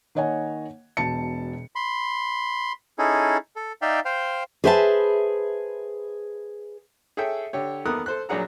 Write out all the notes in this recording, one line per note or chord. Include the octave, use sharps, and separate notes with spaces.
D#3 A#3 C#5 D#5 F#5 G#5
E1 B2 A5 C#7
B5 C6
C#4 D#4 E4 G#4 A4
A4
D#4 D5 E5 F5 G5
C5 F5 G5
G#4 B4 C5 E5 G5 A5
G#4 A4 C#5 E5 G5
D3 G4 C#5
D#2 B3 A4 A#4 D#6 F#6
A4 C5 F#6
A#1 F#3 D4 G#4 F#5 A#5